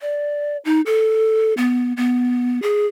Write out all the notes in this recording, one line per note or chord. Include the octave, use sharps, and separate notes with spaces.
D5
D#4
A4
B3
B3
G#4